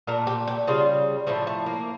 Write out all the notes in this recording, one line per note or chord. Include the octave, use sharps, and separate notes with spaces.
A#2 A3 A#4
G4
G4
C#3 G3 F4
A2 F3 A3 C#4
A3
A#3